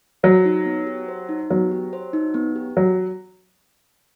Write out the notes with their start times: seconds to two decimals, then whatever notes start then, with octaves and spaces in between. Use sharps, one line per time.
0.23 F#3 C5
0.45 D#4
0.66 B3
0.87 G4
1.08 C5
1.29 D#4
1.50 F#3 B3
1.72 G4
1.93 C5
2.13 D#4
2.34 B3
2.56 G4
2.77 F#3